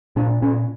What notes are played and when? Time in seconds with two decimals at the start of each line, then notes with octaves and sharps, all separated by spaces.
0.16 A#2 D4
0.42 A#2 C#4